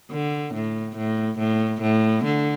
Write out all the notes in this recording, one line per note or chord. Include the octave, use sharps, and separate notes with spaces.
D3
A2
A2
A2
A2
D3